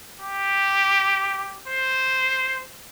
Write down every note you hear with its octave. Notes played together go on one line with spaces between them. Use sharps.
G4
C5